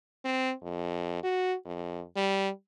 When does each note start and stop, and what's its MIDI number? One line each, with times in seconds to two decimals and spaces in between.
0.24 0.53 60
0.62 1.23 41
1.23 1.55 66
1.65 2.02 41
2.16 2.49 55